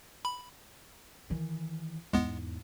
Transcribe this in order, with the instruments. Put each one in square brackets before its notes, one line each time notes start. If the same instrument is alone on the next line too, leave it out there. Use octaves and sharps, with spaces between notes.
[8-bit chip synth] B5
[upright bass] D#3 E3
[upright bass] E2 G#2 [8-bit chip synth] G#3 B3